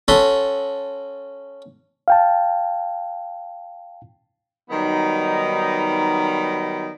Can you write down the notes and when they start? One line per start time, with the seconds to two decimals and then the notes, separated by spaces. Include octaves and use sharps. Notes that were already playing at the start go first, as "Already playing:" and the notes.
0.08 C#4 F#4 A4 B5 C6
2.08 F5 G5 A5
4.70 D#3 F#3 G3 B3 D#4